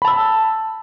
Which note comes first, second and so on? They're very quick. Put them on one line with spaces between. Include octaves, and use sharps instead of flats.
B5 A5 E6